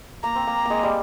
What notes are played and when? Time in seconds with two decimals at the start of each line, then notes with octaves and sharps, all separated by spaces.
0.23 A#3 A#5
0.36 C4
0.47 A#3
0.65 G#3 A#3
0.83 G3